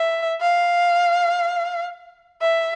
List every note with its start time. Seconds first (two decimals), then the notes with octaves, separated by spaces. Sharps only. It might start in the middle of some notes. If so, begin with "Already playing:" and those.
Already playing: E5
0.41 F5
2.41 E5